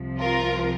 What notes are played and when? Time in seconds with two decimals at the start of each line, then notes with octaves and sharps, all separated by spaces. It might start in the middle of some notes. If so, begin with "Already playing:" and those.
Already playing: C2 C3 F3
0.19 F4 A#4